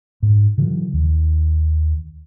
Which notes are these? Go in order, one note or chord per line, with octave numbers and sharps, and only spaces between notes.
G#2
C#3 E3 F#3
D#2